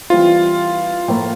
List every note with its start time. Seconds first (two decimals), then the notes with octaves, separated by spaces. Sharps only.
0.10 E3 G3 C4 E4 F4
1.08 A2 F3 A#3